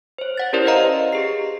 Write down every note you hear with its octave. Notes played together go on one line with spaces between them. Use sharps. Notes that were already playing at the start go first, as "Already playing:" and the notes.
C5 C#5
C#5 F#5 A6
C#4 E4 G4 A#4 C5 D5
B4 C5 D#5 F5 A#5
G4 G#4 C7